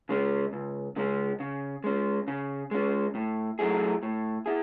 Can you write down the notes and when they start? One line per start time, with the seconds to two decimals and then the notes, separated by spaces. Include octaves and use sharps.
0.09 C#3 G#3 C#4
0.53 C#2
0.96 C#3 G#3 C#4
1.40 C#3
1.84 G#3 C#4
2.28 C#3
2.71 G#3 C#4
3.15 A2
3.59 F#3 A3 E4 G#4
4.03 A2
4.46 E4 G#4